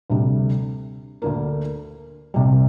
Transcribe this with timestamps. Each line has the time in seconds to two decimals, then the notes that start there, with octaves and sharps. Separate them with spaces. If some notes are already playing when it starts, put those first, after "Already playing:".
0.10 D2 C3 G3
1.22 D2 D3 A#3
2.34 C2 C3 G3